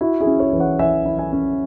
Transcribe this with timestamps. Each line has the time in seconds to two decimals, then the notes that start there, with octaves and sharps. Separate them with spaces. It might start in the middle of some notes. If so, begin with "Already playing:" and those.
0.01 E4 F#4
0.21 E4 G#4
0.27 C#4
0.40 G#4 C#5
0.53 E3
0.60 C#5 F#5
0.79 E3 E5 G#5
1.05 E4
1.19 E5 G#5
1.32 C#4